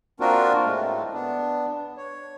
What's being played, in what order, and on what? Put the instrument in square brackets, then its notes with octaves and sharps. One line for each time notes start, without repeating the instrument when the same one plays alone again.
[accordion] A#3 C4 D4 F4 F#4 A#4
A2 G#3 A3
B3 D4
C#5